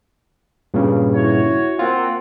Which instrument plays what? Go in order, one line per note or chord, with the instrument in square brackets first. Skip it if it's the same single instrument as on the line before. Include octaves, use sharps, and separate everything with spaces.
[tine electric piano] G2 A#2 C#3
[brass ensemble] E4 F#4 C#5
[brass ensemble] A#3 C4 F#5 [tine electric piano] F4